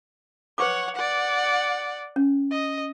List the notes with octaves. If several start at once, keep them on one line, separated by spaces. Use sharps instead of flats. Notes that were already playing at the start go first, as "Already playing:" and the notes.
B4 C#5 F#5 C#6 D6
D5 F#5
C#4
D#5